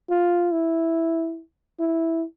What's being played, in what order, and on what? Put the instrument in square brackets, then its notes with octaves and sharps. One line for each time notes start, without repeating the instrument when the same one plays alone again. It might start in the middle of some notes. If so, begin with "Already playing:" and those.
[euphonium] F4
E4
E4